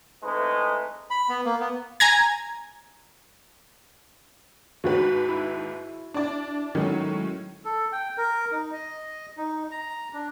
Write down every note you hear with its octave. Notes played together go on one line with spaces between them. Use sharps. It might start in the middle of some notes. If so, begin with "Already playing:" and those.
E3 G#3 A3 C4 D#4 B4
B5
B3
A#3
B3
G#5 A#5 G#6
D#2 G#2 F#4 B4
E4
D4 D5
A2 D#3 F#3 G#3 C#4
A4
G5
A#4
D#4
D#5
D#4
A#5
D4